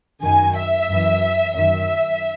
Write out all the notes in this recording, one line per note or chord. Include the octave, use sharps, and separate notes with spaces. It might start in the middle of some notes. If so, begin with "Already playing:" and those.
F#2 D#3 G#5
E5
F#2 E3
F#2 D#3 E5